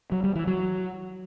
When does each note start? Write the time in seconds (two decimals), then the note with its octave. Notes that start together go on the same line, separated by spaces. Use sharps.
0.12 F#3
0.24 G3
0.35 E3
0.47 F#3